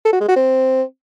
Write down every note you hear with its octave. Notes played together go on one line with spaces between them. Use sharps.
A4
F#4
G#3
F#4
C4